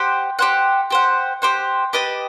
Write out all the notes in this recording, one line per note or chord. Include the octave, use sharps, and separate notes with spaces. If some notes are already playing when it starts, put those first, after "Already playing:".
Already playing: G4 C5 F#5
G4 C5 F#5
G4 C5 F#5
G4 C5 F#5
G4 B4 D#5 A5